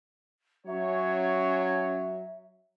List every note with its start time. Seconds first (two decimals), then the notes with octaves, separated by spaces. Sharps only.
0.67 F#3 C#4 C#5 E5